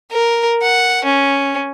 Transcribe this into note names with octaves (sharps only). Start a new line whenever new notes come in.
A#4
F#5
C#4